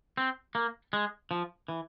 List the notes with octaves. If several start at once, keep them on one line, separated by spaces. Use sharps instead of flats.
C4
A#3
G#3
F3
E3